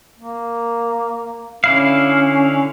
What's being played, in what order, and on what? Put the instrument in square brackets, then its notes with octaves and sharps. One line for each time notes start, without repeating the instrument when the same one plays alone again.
[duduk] A#3
[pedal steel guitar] D3 E4 F5 [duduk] C#4